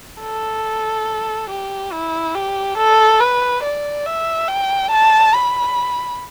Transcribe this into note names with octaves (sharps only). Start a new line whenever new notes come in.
A4
G4
E4
G4
A4
B4
D5
E5
G5
A5
B5